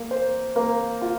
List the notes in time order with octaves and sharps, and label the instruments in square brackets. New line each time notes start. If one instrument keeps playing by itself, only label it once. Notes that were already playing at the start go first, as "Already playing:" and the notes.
Already playing: [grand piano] A#3
C5
A#3
F4